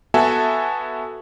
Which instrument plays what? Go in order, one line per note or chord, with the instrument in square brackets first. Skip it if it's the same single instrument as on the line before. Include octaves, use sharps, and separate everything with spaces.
[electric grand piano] B3 F#4 A4 E5 G#5 A5